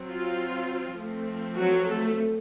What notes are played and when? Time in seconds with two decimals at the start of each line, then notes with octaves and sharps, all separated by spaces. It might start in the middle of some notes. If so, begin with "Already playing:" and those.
Already playing: F#3 C4
0.09 F4
0.98 F3 A3 C4
1.59 F#3 F#4
1.89 A3 A4